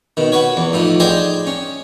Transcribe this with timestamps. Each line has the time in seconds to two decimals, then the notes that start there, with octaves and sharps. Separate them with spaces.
0.17 B2 D#3
0.32 F#4 B4 C#5
0.57 E2
0.73 A2 F3 D#4
1.00 D#4 G#4 C5 D5 D#5 G5
1.47 C#4